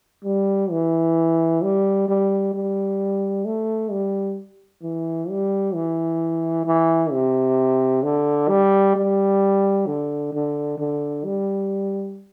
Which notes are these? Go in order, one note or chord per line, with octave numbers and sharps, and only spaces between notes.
G3
E3
G3
G3
G3
A3
G3
E3
G3
E3
E3
C3
D3
G3
G3
D3
D3
D3
G3